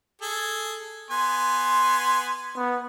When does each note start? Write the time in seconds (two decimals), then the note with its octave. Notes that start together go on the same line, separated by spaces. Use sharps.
0.22 G#4 A4
1.11 B3 G#5 C6
2.57 B3